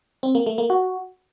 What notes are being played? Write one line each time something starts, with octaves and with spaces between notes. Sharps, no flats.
C4
A#3
A3
A#3
F#4